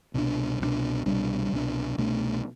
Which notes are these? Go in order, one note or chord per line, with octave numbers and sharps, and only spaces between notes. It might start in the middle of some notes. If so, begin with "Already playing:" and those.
C2 B2 G3 D4
C2 B2 G3 D4
C2 B2 G3 D4
C2 B2 G3 D4
C2 B2 A3 D4